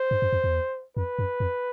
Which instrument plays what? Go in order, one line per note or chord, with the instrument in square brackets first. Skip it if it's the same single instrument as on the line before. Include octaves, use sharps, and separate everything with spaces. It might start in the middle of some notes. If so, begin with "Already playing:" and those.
Already playing: [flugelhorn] C5
[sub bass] G2
F#2
F2
E2
[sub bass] F2 [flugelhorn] B4
[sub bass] F#2
F2